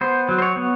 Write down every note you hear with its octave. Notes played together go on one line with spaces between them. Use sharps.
B3 C5
F#3
C5
C#5
B3